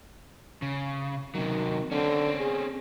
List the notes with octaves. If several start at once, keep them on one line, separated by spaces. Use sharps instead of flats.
C#3
C3 D#3 F#3
D3 C4 C#4
G#4